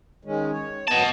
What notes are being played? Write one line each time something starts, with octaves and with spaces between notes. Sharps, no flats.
D#3 G#3 C#4
C#5
F#2 B3 D#5 A5